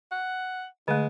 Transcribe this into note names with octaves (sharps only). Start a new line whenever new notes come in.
F#5
D3 G#3 A3